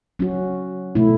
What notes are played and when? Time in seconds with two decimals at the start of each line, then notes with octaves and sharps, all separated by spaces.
0.19 F#3 C#4 F#4
0.95 B2 A3 E4